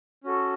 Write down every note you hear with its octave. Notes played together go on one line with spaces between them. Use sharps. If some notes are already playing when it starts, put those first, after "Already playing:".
C#4 F#4 A4